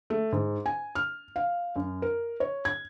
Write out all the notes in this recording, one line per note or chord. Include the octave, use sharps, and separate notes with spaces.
A3
G#2
G#5
F6
F5
F#2
A#4
C#5
G#6